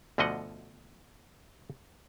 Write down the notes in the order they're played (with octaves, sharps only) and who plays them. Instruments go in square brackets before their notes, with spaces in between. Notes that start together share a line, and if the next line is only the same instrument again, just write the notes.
[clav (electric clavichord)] D2 B2 D3 F3 D#5 F#5